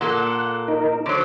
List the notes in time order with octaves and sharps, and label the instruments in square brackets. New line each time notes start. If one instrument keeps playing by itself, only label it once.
[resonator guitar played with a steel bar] A#2 A#3 A4 [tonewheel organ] F#5
[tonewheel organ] D#4 A#4
[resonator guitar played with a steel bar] D3 F#3 [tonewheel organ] C5 C#5 D6